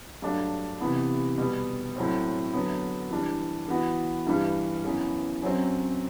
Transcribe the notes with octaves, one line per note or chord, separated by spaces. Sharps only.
G2 F#3 A3 D4
C3 E3 B3
B2 G3 B3
A2 F#3 C4
D3 F#3 B3
E3 G3 D4
E3 B3 F#4
G2 E3 G3
F#2 E3 B3
F#2 F#3 C4